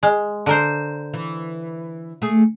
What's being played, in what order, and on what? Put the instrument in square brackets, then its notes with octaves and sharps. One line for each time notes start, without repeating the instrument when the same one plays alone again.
[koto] G#3
D3 A#4 C5
[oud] E3
A3 G#4